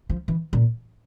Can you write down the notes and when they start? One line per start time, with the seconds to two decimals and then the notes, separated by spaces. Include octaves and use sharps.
0.10 F3
0.28 E3
0.53 A#2